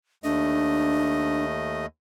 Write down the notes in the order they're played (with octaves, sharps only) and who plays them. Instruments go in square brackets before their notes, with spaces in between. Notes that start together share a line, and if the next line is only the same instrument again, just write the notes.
[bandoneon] D#2 A3 D#5 [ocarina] D4